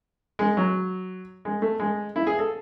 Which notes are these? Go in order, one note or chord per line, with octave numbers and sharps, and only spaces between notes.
G#3
F#3
G#3
A3
G#3
E4
G#4
A4